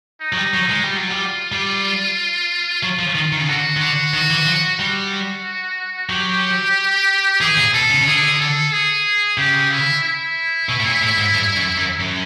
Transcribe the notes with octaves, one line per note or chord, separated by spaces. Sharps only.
D#4
F#3
G3
F#3
G#3
G3 F4
F#3
G3
G3
F#3 F4
F3
D#3
D#3
C#3
D3 F#4
D#3
D3 F#4
D#3
E3
F3
G3 F#4
F#3 G4
E3 G#4
A#2
B2 A4
C#3
C#3
D3 G#4
A4
G#4
C#3 G4
E4
E4
B2
A2
A#2
A2
G#2
G2
F#2
F#2
F#2